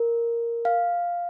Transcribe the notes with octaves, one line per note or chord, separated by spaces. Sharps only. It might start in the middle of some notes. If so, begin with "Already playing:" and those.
Already playing: A#4
F5